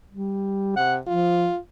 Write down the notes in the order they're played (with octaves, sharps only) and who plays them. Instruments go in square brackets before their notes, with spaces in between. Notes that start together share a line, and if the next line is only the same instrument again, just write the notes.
[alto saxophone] G3
[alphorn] C3 [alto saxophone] F#5
[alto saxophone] F3 [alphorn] F4